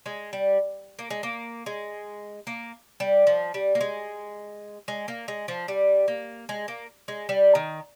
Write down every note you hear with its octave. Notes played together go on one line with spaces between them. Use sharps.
G#3
G3
A#3
G#3
A#3
G#3
A#3
G3
F3
G3
A#3
G#3
G#3
A#3
G#3
F3
G3
A#3
G#3
A#3
G#3
G3
D#3